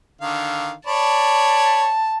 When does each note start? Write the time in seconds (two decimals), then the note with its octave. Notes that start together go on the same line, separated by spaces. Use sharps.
0.21 D3 D#3 F5
0.87 C#5 D5 A5 B5